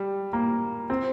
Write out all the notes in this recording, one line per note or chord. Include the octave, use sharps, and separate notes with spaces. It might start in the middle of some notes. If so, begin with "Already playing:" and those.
Already playing: G3
A#3
C4